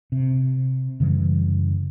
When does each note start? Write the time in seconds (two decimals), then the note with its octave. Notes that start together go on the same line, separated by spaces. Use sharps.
0.12 C3
1.00 F#2 C#3 E3 G3